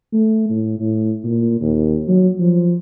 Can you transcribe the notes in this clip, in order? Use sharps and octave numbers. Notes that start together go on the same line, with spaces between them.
A3
A2
A2
A#2
D#2
F#3
F3